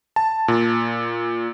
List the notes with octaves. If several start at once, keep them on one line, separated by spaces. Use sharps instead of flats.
A5
A#2